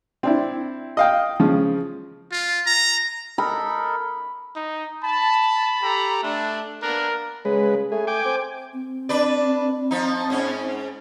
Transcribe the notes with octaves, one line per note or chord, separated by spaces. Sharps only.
C4 D4 E4
D#5 F5 G5
C#3 F3
F4
A#5
D#4 A4 A#4 B5
D#4
A5 B5
G4 A4 A#5
A3 D4
A#3 B3 D4 A#4
C#3 G#3 B4
A3 G#4
G5 G#5 D6
C4
C4
D4 B4 D5
F3 D#4
G#2 C#4